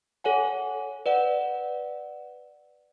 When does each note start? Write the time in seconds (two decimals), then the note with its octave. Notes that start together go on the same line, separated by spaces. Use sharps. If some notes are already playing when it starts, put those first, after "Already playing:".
0.24 A4 C#5 F#5 G#5
1.06 B4 D5 F#5